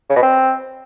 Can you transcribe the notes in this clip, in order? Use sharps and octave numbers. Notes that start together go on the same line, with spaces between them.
C#3
B2
C4